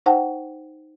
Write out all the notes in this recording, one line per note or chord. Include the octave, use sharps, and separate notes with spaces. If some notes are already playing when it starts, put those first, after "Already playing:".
D#4 C5 F#5 G5 A5